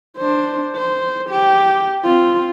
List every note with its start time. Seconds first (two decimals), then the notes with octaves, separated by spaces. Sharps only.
0.18 D4 C5
0.76 C5
1.30 G4
2.04 C4 F4